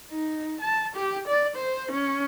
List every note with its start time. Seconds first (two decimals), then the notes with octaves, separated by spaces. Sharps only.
0.12 D#4
0.61 A5
0.96 G4
1.28 D5
1.56 C5
1.92 C#4